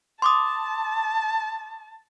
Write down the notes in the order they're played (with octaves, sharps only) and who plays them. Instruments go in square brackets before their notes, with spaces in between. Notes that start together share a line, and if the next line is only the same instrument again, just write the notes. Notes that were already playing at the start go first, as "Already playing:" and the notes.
[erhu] A5 [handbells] C6 D6 D#6